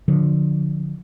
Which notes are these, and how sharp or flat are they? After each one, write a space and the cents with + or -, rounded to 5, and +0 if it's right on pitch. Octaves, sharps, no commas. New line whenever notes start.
D3 +0 F3 +20